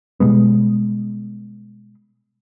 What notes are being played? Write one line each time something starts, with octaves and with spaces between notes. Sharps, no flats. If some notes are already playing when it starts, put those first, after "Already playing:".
B2 G3 G#3 B3